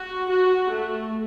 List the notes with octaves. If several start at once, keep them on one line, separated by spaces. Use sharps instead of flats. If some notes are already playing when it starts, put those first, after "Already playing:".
Already playing: F#4
F#4
A3